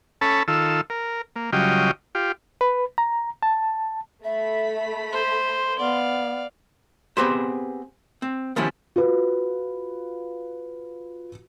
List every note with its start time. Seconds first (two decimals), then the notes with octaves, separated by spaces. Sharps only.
0.21 C#4 A4 A5 B5
0.48 D#3 F4 A4 E6
0.90 A#4
1.36 A#3
1.53 C#3 F#3 G3 F4 D#5 G5
2.15 F4 G4
2.61 B4
2.98 A#5
3.43 A5
4.24 A3 E5 B5 B6
5.12 C5 C6
5.79 B3 D5 F5
7.17 B3 C4 G4 G#4 B4 C5
8.22 C4
8.56 D#3 F3 G3 B3 C#4 E4
8.96 F4 F#4 B4